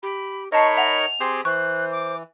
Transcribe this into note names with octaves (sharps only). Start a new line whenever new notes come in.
G4 B5
D#4 A#4 C#5 D#5 A5 B5 C#6 C7
E5 F#5 F7
C4 G4 G#4 C6
E3 C5 C#6 F#6
D6